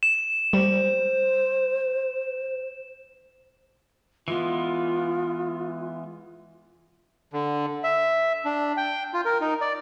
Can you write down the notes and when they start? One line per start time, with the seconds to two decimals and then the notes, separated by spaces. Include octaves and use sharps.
0.03 E7
0.53 G3 C5
4.28 E3 G#3 B3 F4
7.33 D3
7.84 E5
8.45 D4
8.77 G5
9.14 F4
9.25 A#4
9.41 D#4
9.61 D5